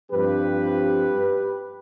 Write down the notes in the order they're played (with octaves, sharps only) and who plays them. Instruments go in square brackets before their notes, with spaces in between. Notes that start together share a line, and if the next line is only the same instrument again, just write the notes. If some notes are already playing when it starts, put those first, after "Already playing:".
[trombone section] G2 F3 C4 G4 B4